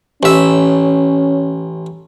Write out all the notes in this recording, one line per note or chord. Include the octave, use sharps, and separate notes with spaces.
A1 C#4 E5